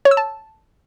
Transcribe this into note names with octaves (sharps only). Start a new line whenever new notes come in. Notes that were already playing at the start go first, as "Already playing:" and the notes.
C#5
E6
A5